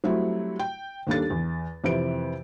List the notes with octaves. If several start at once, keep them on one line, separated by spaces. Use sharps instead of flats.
F#3 G3 A3 C4 E4 F#4
G5
D#2 G3 A#3 D4 A4 A6
E2
F2 C3 E3 B4 D7